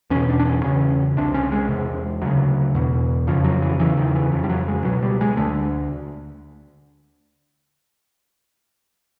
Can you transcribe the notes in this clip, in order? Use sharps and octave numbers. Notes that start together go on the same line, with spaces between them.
E2 B2 C#4
D4
D4
C#4
E2 C#3 C#4
C2 C3 D4
C#4
G#3
E2 C3
D2 C#3 F#3
E2 B2
F2 C#3 F3
F#3
E3
E2 C#3 E3
D#3
D#3
E3
F2 C#3 F3
G3
F#3
G#3
C#2 B2 F#3
G3
G#3
D2 D3 A3